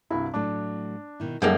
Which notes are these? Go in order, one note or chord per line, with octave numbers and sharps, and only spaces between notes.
C2 G2 E4 F#4
A2 F#3 A3 D4
B2 D#3 E4
F#2 G3 G#3 A#3 D#4 G#4 A4 F#5